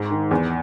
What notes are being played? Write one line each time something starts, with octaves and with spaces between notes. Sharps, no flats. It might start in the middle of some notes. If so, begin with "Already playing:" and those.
Already playing: G#2
D#3
E2